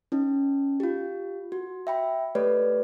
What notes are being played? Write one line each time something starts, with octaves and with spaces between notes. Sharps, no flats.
C#4 D#4
F4 G4
F#4
E5 G5 B5
A3 G4 B4 C#5 D5